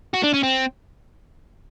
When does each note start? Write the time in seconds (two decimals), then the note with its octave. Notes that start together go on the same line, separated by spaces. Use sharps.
0.14 F#4
0.24 D4
0.34 C#4
0.43 C4